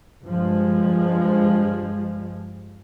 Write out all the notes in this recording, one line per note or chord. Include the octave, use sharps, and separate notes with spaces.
G2 F3 G#3